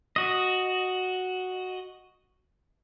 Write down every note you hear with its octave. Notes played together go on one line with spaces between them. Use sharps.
F#4 D#5